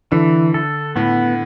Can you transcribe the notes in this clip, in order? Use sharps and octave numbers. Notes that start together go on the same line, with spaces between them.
D3 E3
A4
A2 B3